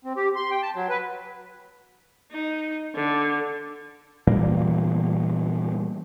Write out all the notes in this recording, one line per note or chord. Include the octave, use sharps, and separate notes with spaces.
C4
G4
C6
G5
A5
F#3
B4
D#4
D3
A#2 E3 G3 A#3